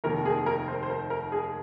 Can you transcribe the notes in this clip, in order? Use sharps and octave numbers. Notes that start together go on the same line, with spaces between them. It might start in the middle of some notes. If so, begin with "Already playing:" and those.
F1 D#2 D#3 A#3 A#4
G#4
A#4
C5
C5
A#4
A#4
G#4